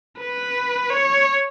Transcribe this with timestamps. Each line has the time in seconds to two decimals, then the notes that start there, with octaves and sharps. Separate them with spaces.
0.19 B4
0.90 C#5